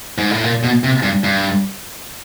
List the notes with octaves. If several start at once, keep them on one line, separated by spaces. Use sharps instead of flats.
G#2
A2
A#2
B2
C3
G2
G2